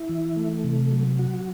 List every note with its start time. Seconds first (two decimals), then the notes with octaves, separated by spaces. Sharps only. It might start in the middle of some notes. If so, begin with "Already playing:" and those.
Already playing: E4
0.09 E3
0.36 A3
0.64 C3
0.91 F#3
1.19 F#4